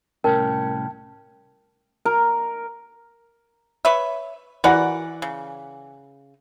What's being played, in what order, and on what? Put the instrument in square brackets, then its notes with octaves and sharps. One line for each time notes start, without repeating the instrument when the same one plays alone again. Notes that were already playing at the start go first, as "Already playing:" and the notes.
[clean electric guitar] C2 A2 C#4 [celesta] A#4 [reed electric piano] G5 A5
[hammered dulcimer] A#4
[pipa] B4 C#5 E5
[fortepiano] E3 D5 F#5 [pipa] F#4 A#4 B4
[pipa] C#3